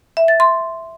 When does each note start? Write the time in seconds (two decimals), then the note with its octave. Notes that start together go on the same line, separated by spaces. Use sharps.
0.17 E5
0.28 A6
0.40 C6